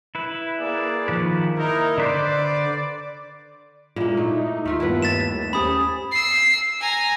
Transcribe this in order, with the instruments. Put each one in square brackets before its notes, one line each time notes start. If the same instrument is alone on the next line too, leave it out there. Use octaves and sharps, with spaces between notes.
[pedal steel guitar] E4 B4
[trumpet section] A#3 G#4 D5
[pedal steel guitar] D#3 F3 B4
[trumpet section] A#3 D#4 A#4 [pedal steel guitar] E4
[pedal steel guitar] D3 B4 C5 [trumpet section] D5
[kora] A#2 A#3 [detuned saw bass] G#3 [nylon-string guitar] D4 E4
[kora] A3 [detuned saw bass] D#4
[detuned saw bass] D#2 [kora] A3 F4 E5
[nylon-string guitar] G2 B3 A5 [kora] E4 B4
[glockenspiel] A6 B6 E7
[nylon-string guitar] C#4 G4 C5 [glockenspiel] B5 D#6
[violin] E6 C7
G#5 A#5